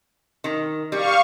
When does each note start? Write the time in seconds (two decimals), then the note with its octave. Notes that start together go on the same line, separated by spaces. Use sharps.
0.44 D#3
0.92 G3 F5 C#6